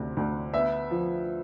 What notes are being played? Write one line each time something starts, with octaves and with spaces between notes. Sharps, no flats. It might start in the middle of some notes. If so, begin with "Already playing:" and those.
Already playing: D2 C3
D2
B3 E5
F3